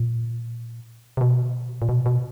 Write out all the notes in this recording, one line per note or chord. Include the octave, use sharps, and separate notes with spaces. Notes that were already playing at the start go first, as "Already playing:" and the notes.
Already playing: A#2
C3
B2
A#2
B2
B2